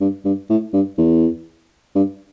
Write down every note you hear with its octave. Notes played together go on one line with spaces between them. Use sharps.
G2
G2
A2
G2
E2
G2